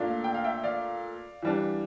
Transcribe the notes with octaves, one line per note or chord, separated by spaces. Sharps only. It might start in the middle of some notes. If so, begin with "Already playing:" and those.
Already playing: A#2 A3 D4 D5 F5
G5
F5
E5 G5
D5 F5
E3 G3 D4